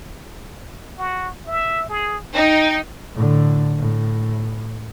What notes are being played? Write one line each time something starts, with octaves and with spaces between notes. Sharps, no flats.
F#4
E5
G#4
D#4 G5
A2 D3
A2